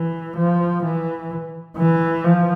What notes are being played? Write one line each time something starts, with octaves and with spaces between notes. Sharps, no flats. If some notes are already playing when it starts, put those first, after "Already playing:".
Already playing: E3
F3
E3
E3
F3